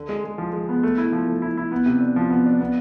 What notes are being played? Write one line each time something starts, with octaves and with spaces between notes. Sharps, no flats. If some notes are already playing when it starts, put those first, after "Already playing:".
Already playing: D3
G#3
G#3
F3
G#3
B3
A3
E4
F3
A3
E4
E4
B3
C3
D4
F3
B3
D4
B3